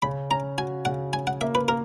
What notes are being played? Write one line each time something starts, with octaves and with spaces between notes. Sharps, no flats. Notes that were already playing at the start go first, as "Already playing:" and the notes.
C#3 B5
C#4 A#5
F#4 G#5
C#3 F#5
C#4 G#5
F#5
A#3 E5
B4
A#3 A#4